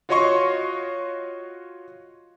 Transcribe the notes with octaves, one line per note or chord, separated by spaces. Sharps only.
F4 F#4 C#5 D#5 C6 C#6